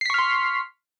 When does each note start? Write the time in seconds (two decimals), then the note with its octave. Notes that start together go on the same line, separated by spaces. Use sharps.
0.01 C7
0.05 B6
0.10 C#6
0.14 F6
0.18 C6